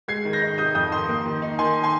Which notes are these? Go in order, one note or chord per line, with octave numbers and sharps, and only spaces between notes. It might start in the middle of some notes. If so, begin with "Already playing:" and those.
G#3 G#6 C7
D#3
G6 A#6
D#4
C3 D#6 G6
F2 D#6 G6
D#3 C6 D#6
A#3
D#3
D#4
D#3 G#5 C6
G#5 C6